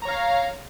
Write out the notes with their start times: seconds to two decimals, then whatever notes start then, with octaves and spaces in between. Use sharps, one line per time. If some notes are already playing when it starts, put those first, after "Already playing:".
0.02 A#5
0.05 C#5
0.08 F5